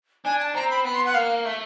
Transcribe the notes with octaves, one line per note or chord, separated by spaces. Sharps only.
D4 G#5
A5
C4 A#5
B5
B3 B5
C6
F#5
A#3 F5
A3 E5